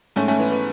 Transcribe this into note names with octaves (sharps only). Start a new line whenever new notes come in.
G#2 A3 C#4
A3 C#4
E3 B3
B3